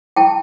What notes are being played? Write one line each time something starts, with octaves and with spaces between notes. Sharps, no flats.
E4 G5 A5